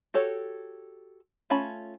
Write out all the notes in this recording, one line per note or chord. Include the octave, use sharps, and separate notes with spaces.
F#4 G4 A4 C#5
A3 C#4 F4 A5 B5